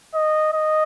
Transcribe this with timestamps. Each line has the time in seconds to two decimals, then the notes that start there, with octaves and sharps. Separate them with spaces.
0.14 D#5
0.53 D#5